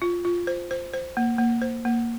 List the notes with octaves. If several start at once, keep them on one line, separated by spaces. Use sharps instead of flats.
F4
F4
C5
C5
C5
A#3
A#3
C5
A#3